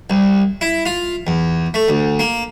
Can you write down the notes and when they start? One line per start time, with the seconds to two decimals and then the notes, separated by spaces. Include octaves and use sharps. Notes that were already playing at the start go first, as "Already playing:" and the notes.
0.10 C2
0.61 E4
0.86 F4
1.27 E2
1.74 A3
1.88 D2
2.19 A#3